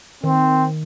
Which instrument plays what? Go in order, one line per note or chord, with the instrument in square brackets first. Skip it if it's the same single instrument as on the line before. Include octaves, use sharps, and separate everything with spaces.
[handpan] D#3 [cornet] C4